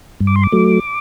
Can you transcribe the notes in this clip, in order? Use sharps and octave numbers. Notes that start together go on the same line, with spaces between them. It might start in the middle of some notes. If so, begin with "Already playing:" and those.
G2
D6
C6
D6
F#3 A3